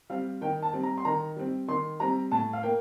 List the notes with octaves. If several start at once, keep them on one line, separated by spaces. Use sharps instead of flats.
G3 C4 F5
D#3 G5
A5
G3 C4
A#5
C6
D#3 A#5
G3 C4
D#3 C6
G3 C4 A#5
A2 A5
F5
A#3 G5